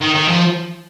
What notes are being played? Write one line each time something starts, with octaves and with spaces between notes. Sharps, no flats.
D#3
D#3
F3